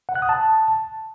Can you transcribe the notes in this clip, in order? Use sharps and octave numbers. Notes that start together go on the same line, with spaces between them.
F#5
F#6
D#6
A5